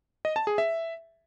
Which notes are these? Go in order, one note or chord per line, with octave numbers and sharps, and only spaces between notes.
D#5
A5
G#4
E5